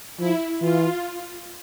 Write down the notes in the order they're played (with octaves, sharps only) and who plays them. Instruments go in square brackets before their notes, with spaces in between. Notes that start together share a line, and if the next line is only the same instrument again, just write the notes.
[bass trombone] F3 [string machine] E4
[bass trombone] E3 [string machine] F4